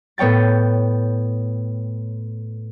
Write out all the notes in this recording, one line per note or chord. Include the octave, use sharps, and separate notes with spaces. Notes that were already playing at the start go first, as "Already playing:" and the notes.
A2 B3 C#5 G5 A6